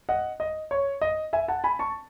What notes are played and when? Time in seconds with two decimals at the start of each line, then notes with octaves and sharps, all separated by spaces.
0.09 D#5 F#5
0.40 D#5
0.71 C#5
1.02 D#5
1.33 E5 G#5
1.48 F#5 A5
1.64 G#5 B5
1.79 A5 C#6